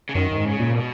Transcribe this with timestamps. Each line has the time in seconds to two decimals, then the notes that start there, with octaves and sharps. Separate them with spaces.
0.09 C#3
0.15 F#2 D#3
0.31 F#2
0.36 G#2
0.45 C#3
0.60 A#2
0.74 B2